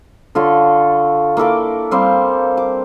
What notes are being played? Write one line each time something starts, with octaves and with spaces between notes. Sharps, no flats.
D3 F4 A4 C#5
A#3 E4 A4 D6
G3 C4 C5 F5
D6